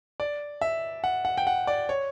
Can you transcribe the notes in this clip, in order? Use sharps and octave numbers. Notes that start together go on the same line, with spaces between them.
D5
E5
F#5
F#5
G5
F#5
D5
C#5